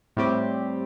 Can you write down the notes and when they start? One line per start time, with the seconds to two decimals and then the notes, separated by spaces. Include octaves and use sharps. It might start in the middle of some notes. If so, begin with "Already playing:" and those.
0.17 A2 G3 C4 G4